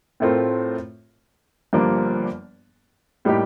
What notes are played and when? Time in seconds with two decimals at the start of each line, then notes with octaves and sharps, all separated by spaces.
0.20 A2 A3 C4 F4 A#4
1.73 G1 G2 F3 A#3 D4
3.25 A2 G3 A#3 D#4 G4